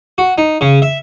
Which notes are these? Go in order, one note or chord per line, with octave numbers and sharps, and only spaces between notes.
F#4
D#4
C#3
E5